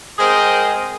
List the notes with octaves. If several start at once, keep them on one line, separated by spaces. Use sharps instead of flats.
G#3 C4 G#4 A#4 C5 D#5